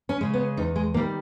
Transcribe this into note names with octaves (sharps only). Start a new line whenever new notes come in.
C#4
C#3 G#3
B3
E2 D#4
G#3
D#3 G3 A#3